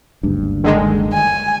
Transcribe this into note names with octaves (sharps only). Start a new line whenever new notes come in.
F#1 D2 G2
D3 D#3 G#3
G#5